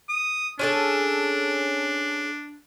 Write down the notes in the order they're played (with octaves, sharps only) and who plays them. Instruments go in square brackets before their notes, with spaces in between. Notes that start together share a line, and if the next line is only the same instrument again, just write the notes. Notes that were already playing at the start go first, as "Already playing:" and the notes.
[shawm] D#6
[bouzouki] C#4 G#4 A4 [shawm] D4